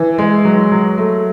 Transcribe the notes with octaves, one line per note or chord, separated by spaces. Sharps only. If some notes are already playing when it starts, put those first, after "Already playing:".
Already playing: E3
G#3
F#3
F#3
A3